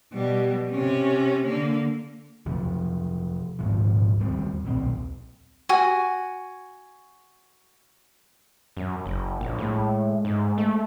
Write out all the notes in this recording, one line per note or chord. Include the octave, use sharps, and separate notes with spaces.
B2 G3
C3 C#4
D3 A#3
C3 F3 F#3
D#1 G#2 C3 F3
D#2 G3 C4
D#1 B1 C4
F#4 G#5
F#2
F#1
A#1
A2 G#3
G#2
A3